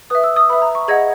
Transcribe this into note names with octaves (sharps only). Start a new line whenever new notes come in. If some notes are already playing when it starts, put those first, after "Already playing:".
B4 E5 D#6
E6
D#6
B4 E5 B5
A#5
C#6
G#4 D#5 F#5 G#6